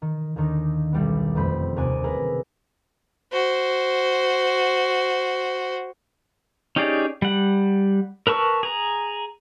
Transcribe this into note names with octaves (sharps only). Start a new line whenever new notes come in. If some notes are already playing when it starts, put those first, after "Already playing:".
D#3
D#2 D3 D#3 D4 D#4
B1 G3 B3
F#1 F2 A3 C5 B5
D#2 C3 D5 G#5 F#6 D#7
E4 G#4 A#4 B4
F#4 C5
C#4 D#4 G4 G#4 D5
G3 F#5
A#4 B4 A5 C#6 E6
G#4 A#5